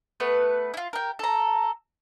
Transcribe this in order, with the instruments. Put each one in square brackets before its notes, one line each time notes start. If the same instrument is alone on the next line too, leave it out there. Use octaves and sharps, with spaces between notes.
[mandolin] A3 B3 B4
E4 F4
G4 A#4
A4 A#5